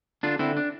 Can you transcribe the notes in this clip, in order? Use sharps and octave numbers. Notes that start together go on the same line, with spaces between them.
D3 D4 F4
D3 C4 E4
D4